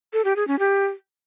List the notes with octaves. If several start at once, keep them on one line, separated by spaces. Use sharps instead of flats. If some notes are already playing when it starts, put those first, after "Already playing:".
A4
G4
G#4
C#4
G4